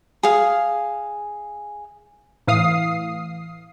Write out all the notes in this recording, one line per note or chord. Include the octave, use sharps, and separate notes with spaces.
G#4 F5
A2 E3 F5 D#6 C7